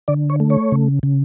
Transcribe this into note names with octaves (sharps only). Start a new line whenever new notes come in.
D3 D5
C#5
A3
C#5
C#3
C#3